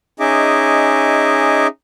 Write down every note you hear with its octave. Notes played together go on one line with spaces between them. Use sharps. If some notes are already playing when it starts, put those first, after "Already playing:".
C#4 D#4 G#4 D#5 E5 D6